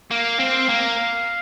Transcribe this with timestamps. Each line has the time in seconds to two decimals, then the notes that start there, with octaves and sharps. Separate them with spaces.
0.11 A#3 F5
0.40 C4
0.69 A#3